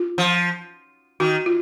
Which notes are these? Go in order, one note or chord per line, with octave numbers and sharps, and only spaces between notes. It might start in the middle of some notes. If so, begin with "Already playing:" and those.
Already playing: F4
F3
D#3 F#4
F4